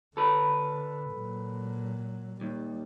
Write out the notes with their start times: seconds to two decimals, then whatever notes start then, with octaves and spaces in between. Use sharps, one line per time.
0.17 D3 A4 B4
1.14 A#2 F#3
2.41 D#2 G3